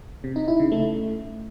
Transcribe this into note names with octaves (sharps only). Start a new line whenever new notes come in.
C3
D#4
E4
C#3
A3